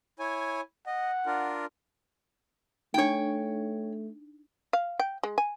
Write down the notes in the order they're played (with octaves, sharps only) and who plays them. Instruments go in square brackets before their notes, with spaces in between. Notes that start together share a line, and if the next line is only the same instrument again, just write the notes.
[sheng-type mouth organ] E4 C#5 G#5
[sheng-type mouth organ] D#5 [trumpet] F#5
[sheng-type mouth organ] D4 F4 A#4
[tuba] A3 [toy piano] D4 D#4 [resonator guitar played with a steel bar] C#5 G5
[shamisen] F5
G5
G#3
G#5